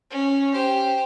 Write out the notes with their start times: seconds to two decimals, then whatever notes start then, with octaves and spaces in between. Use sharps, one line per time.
0.10 C#4
0.52 G4 C5